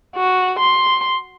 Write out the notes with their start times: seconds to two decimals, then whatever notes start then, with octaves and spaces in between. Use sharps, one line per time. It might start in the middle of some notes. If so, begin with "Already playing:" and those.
0.16 F#4
0.59 C6